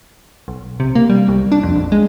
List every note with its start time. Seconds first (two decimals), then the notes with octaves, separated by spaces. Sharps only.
0.48 B1
0.80 C3
0.95 A#3
1.10 G3
1.28 C2
1.52 D4
1.63 F2
1.76 A#1
1.92 G#3